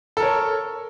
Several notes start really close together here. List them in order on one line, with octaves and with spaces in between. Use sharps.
A4 A#4 C#5